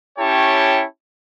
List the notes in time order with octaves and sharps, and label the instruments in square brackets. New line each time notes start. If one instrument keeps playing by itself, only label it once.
[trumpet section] C#4 E4 G4 C#5 G5 A5